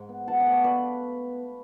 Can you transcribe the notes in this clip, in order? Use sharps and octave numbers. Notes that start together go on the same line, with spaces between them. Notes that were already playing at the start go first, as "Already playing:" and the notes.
Already playing: G#2
B3
B2 F#5 A5
D5 F#5
A3
C#5 F5
A3 B4 D5